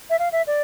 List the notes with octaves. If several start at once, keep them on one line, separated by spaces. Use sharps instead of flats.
E5
F5
E5
D5